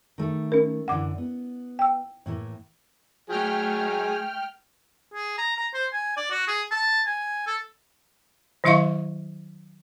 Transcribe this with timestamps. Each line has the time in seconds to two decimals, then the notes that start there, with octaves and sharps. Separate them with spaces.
0.18 D#3 A3
0.52 C#4 A#4
0.88 F#2 D3 E3 F#5 D6
1.18 B3
1.79 G5 E6
2.26 A2 E3 A#3
3.30 F#3 A3 G#4 G5 F6
5.14 G#4
5.38 A#5
5.57 A#5
5.74 C5
5.93 G#5
6.17 D5
6.31 F#4
6.48 G#4
6.71 A5
7.07 G#5
7.47 A4
8.64 D#3 F#3 E4 E5 F5 C#6